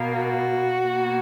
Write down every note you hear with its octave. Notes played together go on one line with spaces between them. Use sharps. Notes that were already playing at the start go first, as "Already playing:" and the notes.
Already playing: B2 A#3
F#4
B2 A#3